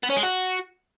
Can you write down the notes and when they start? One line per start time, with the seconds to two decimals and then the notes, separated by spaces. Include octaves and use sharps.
0.03 B3
0.10 C#4
0.17 G#3
0.23 F#4